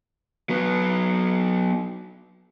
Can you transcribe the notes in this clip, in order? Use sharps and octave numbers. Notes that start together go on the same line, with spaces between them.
F#3 B3